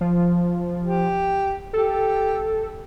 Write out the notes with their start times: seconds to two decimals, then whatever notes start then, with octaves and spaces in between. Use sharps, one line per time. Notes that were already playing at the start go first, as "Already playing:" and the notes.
0.01 F3
0.84 G4
1.73 G4 A4